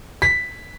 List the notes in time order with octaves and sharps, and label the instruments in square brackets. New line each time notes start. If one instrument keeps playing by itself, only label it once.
[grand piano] B6